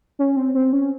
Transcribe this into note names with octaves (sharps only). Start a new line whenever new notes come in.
C#4
C4
C4
C#4